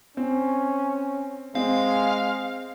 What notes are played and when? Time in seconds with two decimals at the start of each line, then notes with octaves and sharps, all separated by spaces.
0.17 C4 C#4
1.55 G#3 C4 F5